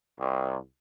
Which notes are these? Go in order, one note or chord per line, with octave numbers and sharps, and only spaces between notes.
C2